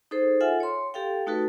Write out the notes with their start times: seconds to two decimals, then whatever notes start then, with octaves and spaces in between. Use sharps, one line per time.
0.11 D#4 G#4 A4 C5
0.41 F4 A4 E5 F#5 G#5
0.60 C#5 C6
0.94 G4 A4 F5 G5
1.27 A3 D#4 F#4 A4 B4